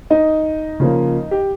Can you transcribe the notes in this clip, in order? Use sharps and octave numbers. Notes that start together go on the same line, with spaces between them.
D#4 D#5
C#3 F3 A#3
G4